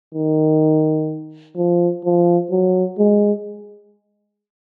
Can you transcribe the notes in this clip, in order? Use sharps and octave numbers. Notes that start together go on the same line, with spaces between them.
D#3
F3
F3
F#3
G#3